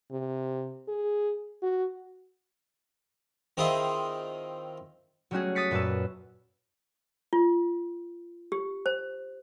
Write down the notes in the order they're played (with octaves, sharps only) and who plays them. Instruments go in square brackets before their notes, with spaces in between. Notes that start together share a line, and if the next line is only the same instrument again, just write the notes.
[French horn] C3
G#4
F#4
[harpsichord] D#3 C4 E4 F4 G#4 D#5
[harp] F#3 G3 A3 C#4 F#4 G#4
D#6 A6 B6 C#7
F#2 A#2 F#4 B4 A5 E6
[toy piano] F4
G4
C5